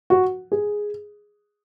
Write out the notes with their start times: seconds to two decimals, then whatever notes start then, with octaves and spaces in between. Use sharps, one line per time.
0.10 F#4
0.52 G#4